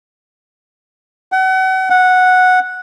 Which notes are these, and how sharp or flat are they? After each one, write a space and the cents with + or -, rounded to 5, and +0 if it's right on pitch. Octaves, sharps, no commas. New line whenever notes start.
F#5 +35
F#5 -10